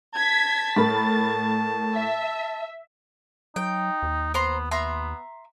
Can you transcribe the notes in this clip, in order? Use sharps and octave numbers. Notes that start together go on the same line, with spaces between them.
A5 G#6 B6
A2 A#4 B5 A6
E5
F#3 D#4 G5
D#2
B3 C5 A#5 C6
B3 E5 A#5 C6